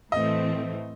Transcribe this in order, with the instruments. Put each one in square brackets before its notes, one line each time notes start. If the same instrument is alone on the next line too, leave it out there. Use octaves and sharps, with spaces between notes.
[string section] A2 E3 A3 C4 [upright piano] D#5